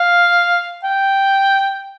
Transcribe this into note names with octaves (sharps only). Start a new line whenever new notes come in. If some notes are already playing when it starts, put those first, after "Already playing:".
Already playing: F5
G5